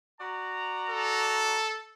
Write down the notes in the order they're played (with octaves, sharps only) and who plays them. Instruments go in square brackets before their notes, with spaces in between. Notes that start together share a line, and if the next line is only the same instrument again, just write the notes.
[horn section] F#4 D5 A#5
[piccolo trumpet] A4